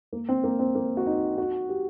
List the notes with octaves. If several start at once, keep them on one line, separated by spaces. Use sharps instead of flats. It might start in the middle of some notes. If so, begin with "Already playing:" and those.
A#3
C4
A#3
C4
A#3
F#4
D#4
F#4
G4